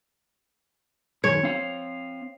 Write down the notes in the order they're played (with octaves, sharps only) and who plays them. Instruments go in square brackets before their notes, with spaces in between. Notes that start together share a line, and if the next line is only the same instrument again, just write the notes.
[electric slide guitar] F#2 D#3 [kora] C#5
[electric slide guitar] C4 F5